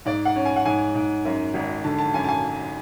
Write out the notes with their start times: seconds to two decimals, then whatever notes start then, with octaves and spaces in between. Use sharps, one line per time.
0.05 G#2 D5
0.25 F#5
0.36 C#4
0.45 G#5
0.56 F#5
0.65 G#2 G#5
0.95 G#2
1.25 F#2
1.54 G#1
1.84 D3 A5
1.98 A5
2.14 F#2 G#5
2.24 A5
2.28 G#5